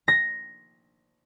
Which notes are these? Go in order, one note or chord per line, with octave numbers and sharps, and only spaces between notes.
A#6